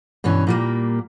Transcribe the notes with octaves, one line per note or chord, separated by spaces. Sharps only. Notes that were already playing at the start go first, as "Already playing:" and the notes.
G2 B2 E3 C#4
A#2 G3 A#3